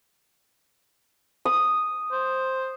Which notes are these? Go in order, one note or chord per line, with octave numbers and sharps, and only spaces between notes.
D#6
C5